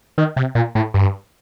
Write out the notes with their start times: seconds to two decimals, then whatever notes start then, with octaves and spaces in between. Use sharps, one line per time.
0.18 D#3
0.36 C3
0.55 A#2
0.75 A2
0.94 G2